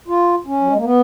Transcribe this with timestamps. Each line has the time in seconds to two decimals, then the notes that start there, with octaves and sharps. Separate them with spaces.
0.08 F4
0.47 C#4
0.61 F#3
0.70 G#3
0.77 A#3
0.85 B3